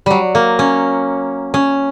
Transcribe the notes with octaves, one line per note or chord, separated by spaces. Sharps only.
F#3 G3
A#3
C#4
C#4